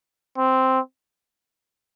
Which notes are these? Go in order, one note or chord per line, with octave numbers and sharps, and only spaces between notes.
C4